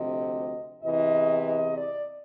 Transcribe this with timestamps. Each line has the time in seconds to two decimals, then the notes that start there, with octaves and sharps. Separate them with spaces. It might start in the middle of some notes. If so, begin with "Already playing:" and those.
Already playing: D2 C3 F3 D#5
0.81 E2 C3 E3 D#5
1.46 D#5
1.77 D5